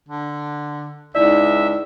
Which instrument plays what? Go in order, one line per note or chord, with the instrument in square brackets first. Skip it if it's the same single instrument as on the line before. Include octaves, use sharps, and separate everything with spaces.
[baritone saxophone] D3
[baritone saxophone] C#2 [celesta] D#4 E4 D5 [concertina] E5